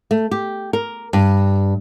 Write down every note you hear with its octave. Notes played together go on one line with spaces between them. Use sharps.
A3
G4
A#4
G2